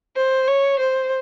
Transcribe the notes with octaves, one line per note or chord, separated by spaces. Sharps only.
C5
C#5
C5